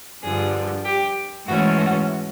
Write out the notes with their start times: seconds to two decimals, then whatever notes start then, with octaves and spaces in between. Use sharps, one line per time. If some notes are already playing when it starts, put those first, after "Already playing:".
0.23 G2 D3 F3 G#4
0.85 G4
1.47 G#2 E3 A3 C#4 F#4
1.78 F#4